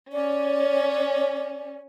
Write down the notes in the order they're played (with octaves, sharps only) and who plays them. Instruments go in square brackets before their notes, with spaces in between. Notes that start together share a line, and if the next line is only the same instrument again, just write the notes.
[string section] C#4 [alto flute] D5